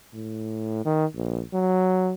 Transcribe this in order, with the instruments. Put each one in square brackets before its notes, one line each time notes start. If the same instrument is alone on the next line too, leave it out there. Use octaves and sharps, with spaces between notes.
[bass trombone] A2
D#3
A#1
F#3